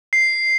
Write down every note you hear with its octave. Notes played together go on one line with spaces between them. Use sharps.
C7